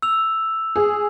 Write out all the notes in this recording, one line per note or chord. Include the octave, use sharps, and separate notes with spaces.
E6 F7
G#4